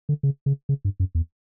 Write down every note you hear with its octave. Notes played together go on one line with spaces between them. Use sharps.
D3
C#3
C#3
C#3
G2
F#2
E2